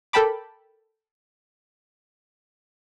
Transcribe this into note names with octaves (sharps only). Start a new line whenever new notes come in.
A4 A#4 G5 A5 B5 D6